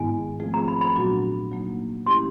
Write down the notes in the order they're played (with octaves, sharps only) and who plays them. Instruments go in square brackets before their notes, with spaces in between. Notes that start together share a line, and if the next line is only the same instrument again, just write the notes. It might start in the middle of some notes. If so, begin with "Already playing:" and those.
Already playing: [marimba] G#2 D#3 G#3 B3 E4 [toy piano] G#5
[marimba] F3 A3 C4 F4 G#4
[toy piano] A#5
B5
B5
[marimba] A#2 F#3 B3 D4 F#4
F#3 A#3 D#4
[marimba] E3 A3 C#4 E4 G4 [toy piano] C6